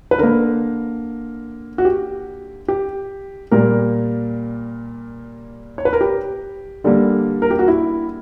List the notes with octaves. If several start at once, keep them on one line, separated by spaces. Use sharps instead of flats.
B4
D3 A#3 A#4
F#4
G4
G4
A#2 G3 A#3 A#4
C#5
B4
A#4
G4
D3 G3 A#3
A#4
G4
F#4
E4